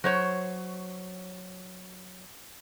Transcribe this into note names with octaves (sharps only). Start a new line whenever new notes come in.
F#3 C5 C#5